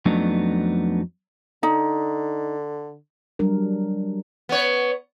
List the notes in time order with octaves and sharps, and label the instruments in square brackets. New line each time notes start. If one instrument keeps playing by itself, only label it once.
[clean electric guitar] F2 F#3 A3 B3 D4 D#4
[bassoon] D3 [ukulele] D#4
[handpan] F#3 G3 D4 A#4
[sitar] B3 C#5